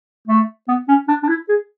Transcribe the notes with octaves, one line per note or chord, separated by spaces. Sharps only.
A3
B3
C#4
D4
D4
E4
G#4